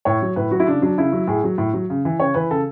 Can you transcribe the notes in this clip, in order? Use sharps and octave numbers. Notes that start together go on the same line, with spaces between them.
A2 C#5
F#3
A2 B4
F#3 F#4
E4
C#3 D4
F#3 D4
C#3 E4
F#3
A2 G#4
F#3
A2
F#3
C#3
E3
C#3 C#5
E3 B4
C#3 A4